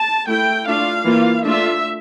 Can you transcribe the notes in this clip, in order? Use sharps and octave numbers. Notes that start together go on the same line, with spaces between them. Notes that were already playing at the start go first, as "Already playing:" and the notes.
Already playing: A5
A3 E4 G5
A3 D4 F4 F5
E3 A#3 F4
A3 D4 F4 E5